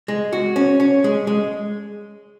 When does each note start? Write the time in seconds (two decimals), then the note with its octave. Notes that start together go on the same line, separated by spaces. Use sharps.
0.08 G#3
0.33 F#4
0.56 C#4
0.80 C#4
1.04 G#3
1.27 G#3